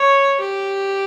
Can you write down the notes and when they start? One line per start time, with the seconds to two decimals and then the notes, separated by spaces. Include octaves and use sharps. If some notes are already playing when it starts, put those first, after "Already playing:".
Already playing: C#5
0.40 G4